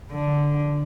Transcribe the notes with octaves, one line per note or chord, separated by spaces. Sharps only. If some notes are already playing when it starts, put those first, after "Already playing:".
D3